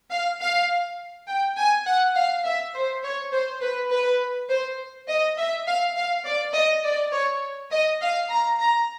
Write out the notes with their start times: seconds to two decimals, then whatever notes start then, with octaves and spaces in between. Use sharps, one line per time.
0.11 F5
0.40 F5
1.27 G5
1.57 G#5
1.86 F#5
2.15 F5
2.44 E5
2.74 C5
3.03 C#5
3.32 C5
3.62 B4
3.91 B4
4.49 C5
5.08 D#5
5.37 E5
5.67 F5
5.95 F5
6.25 D5
6.54 D#5
6.84 D5
7.12 C#5
7.71 D#5
8.00 F5
8.30 A#5
8.59 A#5